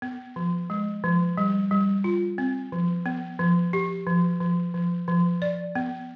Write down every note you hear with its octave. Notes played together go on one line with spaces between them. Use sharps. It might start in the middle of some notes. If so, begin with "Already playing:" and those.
B3
F3
G#3
F3
G3
G3
F4
C4
F3
B3
F3
G4
F3
F3
F3
F3
D5
B3